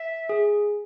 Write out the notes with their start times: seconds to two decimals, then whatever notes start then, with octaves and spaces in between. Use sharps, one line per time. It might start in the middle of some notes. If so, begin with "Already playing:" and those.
Already playing: E5
0.29 G#4